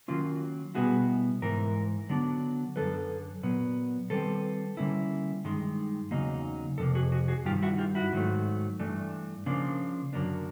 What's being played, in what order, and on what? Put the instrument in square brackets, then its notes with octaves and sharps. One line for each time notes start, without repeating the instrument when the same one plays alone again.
[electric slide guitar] D#3 F#3 A#3 C#4 F4
B2 G3 B3 E4 F#4 G#4
G#2 E3 A#4
D3 F#3 B3 D4
F#2 D3 F#3 A4 B4
A#2 F#3 B3
D#3 G3 C4 A4 B4
D3 G3 A#3 C#4 E4
G2 D#3 G#3
E2 C#3 F#3 A#3 D#4
F2 C3 A#3 A4
F#4 G#4
F#4 G#4
F#4 G#4
G2 D#3 G3 F4 G4
E4 F#4
F4 G4
E4 F#4
G#2 D#3 F#3 A3
G2 E3 A3 D4
C#3 F3 A#3 D4 F4
F#2 D3 F#3 A#3 D4